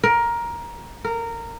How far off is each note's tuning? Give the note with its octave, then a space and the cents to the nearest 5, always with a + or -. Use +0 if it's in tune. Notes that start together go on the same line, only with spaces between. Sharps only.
A#4 +15
A#4 -15